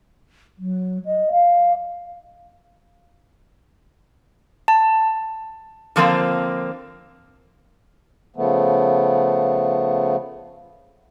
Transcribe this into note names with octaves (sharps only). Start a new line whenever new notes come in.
F#3
D#5
F5
A5
D3 F3 A#3 C4
C#3 F3 A3 B3